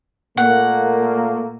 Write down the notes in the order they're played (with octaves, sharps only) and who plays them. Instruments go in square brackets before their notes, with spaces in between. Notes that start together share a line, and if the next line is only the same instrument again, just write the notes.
[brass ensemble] A#2 A3 A#3 [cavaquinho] F#5